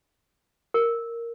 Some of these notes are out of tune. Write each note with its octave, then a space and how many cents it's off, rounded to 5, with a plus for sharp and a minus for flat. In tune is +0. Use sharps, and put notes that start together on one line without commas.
A#4 -5